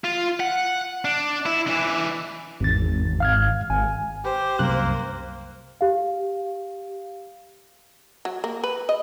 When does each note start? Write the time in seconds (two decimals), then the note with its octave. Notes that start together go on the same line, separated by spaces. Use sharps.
0.05 F4
0.40 F#5
1.05 D4
1.46 E4
1.67 D3 E3
2.60 G#1 E2 A6
3.20 F5 F6 G#6
3.70 G#1 G#5
4.25 G4 C5
4.59 C2 F#2 A#3 F#6
5.81 G4 F5
8.25 F#3
8.44 A#3
8.64 B4
8.89 D#5